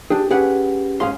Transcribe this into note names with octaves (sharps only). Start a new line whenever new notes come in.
D4 G4 G#4
C#4 G4 G#4 B4 F#5
G#2 C#4 G#4 F5 C6